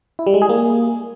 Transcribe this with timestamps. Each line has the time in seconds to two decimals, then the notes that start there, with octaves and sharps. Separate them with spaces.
0.19 E4
0.27 G3
0.34 G#3
0.42 G#4
0.49 A#3